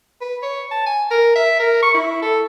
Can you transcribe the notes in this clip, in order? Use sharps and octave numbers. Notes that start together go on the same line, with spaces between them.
B4
C#5
A5
G#5
A#4
E5
A#4
C#6
E4
A4